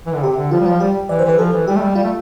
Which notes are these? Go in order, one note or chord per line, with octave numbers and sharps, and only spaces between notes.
E3
D3
C3 G4
D3
F3 F4
G3
F3 F4
G3 G4
E3 D5
C5
E3 B4
F3 A4
E3
G3 G4
A3
G3
G3 F4
A3